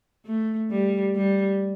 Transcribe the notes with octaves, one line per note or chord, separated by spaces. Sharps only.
A3
G3
G3